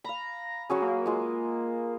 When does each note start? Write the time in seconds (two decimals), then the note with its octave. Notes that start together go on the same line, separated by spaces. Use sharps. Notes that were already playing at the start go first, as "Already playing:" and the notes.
0.04 F5 A#5 B5
0.70 F#3 C#4 F#4 G#4
0.82 A#3
1.06 G#3 F4